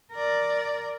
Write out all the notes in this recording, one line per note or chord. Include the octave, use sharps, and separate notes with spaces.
A#4 D5